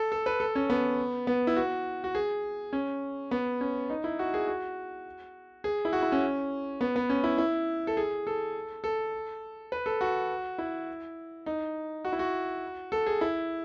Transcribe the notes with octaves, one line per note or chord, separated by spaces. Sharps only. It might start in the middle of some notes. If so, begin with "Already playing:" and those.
Already playing: A4
A4
B4
A4
C#4
B3
B3
E4
F#4
F#4
G#4
C#4
B3
C#4
D#4
E4
F#4
G#4
F#4
G#4
E4
F#4
E4
C#4
B3
B3
C#4
E4
E4
A4
G#4
A4
A4
B4
A4
F#4
E4
D#4
F#4
E4
F#4
A4
G#4
E4